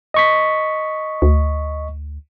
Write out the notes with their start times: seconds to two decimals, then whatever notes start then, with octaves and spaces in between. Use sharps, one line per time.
0.14 D#5 C#6 B6
1.22 D2